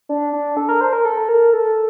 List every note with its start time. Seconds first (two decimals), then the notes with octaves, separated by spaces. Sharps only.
0.09 D4
0.33 D4
0.57 A4
0.69 A#4
0.81 C5
0.93 A#4
1.05 A4
1.28 A#4
1.53 A4